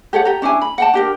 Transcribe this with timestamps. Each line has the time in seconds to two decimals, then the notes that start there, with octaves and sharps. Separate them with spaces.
0.13 G4 A4 C#5 F#5
0.25 G4 A#5
0.42 C#4 D4 E4 G#5
0.62 B5
0.78 F#5 G5 A5
0.94 D4 G4 A#4